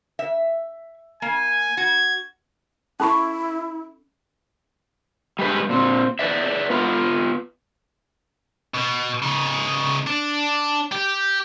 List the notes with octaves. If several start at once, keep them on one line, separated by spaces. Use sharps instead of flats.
E5
A#3 G#5
F#4 G#6
C#4 E4 A4 A5 B5 C#6
G3 G#3 B4
A#2 C4
B4 D5 E5
B3 F4 B4
B2
C#3 D#4
D4
G4